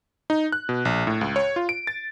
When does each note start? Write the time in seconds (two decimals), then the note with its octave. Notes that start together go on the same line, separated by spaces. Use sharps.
0.30 D#4
0.52 F#6
0.69 B2
0.85 A#1
1.07 A2
1.21 C#2
1.36 C#5
1.56 F4
1.69 D7
1.87 A6